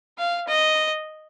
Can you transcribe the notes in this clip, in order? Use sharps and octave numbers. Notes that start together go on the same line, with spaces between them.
F5
D#5